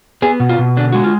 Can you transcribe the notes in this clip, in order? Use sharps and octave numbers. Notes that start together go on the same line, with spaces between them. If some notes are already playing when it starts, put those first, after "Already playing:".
B3 G#4
B2
F4
B2
D3 D4
G#3 F#4
F4